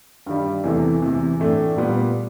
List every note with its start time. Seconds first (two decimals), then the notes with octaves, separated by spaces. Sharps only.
0.26 G2 D#3 G3
0.64 E2 C3 E3 A3
1.02 E2 C3 E3
1.40 A2 E3 A3 D4
1.77 A#2 G3 B3